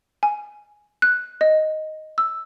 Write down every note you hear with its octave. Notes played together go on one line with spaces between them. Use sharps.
G#5
F#6
D#5
E6